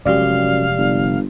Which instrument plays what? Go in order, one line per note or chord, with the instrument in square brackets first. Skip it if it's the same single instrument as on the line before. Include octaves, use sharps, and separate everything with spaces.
[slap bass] F1 G#3 [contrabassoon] F#2 [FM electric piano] G4 D5 [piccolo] F5
[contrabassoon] G1